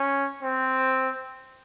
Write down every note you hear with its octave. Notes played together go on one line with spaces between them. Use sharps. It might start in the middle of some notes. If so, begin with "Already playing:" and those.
Already playing: C#4
C4